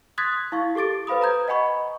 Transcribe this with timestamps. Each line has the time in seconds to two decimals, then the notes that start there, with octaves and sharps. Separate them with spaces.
0.18 C6 D#6 F#6 G#6 A6 B6
0.52 E4 F5 C#6
0.75 G4 A4 D6 A6 D7
1.07 B4 C5 F5 B5 D#6
1.21 B4 A#5 D#6 G6 G#6
1.48 D#5 F#5 G#5 B5 C#6